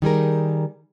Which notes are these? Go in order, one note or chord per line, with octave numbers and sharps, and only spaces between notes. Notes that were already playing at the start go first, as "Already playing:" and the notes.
D#3 G3 G#4 A#4